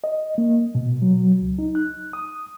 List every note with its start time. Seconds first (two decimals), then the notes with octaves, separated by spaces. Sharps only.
0.04 D#5
0.38 A#3
0.75 B2
1.02 F#3
1.41 C#2
1.59 D#4
1.75 F#6
2.13 D#6